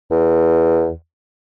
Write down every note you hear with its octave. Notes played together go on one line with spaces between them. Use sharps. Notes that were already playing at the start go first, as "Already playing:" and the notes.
E2